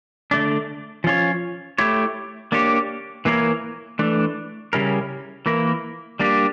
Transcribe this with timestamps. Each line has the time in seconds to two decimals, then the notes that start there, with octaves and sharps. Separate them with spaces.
0.31 D3 A3 D4
1.04 F3 C#4 F4 C#5
1.78 A3 E4 G4 C#5
2.52 A#3 D4 G4 C#5
3.25 E3 A#3 E4 A#4 C#5
3.99 E3 A3 D4
4.73 C#3 G3 C#4 E4 A#4
5.46 E3 A#3 E4 A#4
6.20 G3 A#3 D4 G4